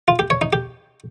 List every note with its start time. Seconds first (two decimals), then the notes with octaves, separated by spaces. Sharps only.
0.08 F4
0.19 G4
0.30 C#5
0.41 D#4
0.53 G4